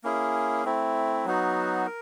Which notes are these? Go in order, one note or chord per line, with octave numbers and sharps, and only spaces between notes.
A#3 C#4 E4 G#4
A3 C4 E4
F#3 B3 D#4 F#4
A#4